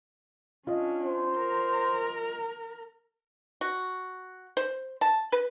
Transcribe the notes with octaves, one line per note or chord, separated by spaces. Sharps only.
C#4 D4 F4 D#5
C5
A#4 A#5
F#4
C5
A5
B4